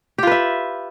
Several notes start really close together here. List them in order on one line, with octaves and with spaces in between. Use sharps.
G4 F4 B4 E5